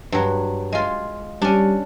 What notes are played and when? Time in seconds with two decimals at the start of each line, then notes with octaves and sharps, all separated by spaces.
0.12 G2 F#3
0.72 G#3 F4
1.42 G3 C#4 D4